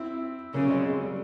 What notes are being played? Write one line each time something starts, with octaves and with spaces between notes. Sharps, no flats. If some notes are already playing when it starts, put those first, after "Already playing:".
Already playing: C4 E4
C#3 A#3 C#4
G#3 C4
G#3
G3